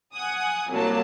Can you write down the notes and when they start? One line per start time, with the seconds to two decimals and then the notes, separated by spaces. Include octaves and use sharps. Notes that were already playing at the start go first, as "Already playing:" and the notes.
0.14 F#5 G#5 D#6
0.71 C2 F#3 A#3 A5